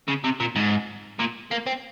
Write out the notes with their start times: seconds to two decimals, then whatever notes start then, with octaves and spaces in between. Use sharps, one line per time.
0.08 C#3
0.24 C3
0.40 A#2
0.56 G#2
1.19 A#2
1.51 A#3
1.67 C4